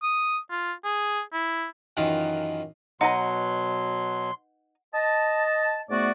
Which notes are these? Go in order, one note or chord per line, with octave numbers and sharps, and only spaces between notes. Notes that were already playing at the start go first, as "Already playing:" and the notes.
D#6
F4
G#4
E4
F#2 D#3 E3 D#4 F4
B2 F#3 D#4 B4 F#5 A#5 C6
D#5 A5
G#2 A3 B3 F#4 D5